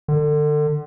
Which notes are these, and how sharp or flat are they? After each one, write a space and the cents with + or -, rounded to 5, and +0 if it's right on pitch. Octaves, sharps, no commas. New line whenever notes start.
D3 +30